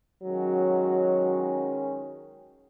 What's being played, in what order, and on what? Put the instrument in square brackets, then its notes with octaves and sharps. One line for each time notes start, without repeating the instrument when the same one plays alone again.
[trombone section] D#3 G#3 C#4 F#4 [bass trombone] F#3